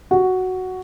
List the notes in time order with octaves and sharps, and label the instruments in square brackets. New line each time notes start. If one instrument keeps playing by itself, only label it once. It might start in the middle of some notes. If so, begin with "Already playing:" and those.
[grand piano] F#4